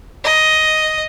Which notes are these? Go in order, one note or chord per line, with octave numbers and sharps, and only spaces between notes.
D#5